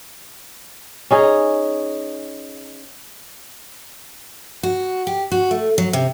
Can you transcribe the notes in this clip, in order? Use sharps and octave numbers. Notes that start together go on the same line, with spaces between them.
C#4 D#4 G#4
F#4
G4
F#4
A3
F#3
C3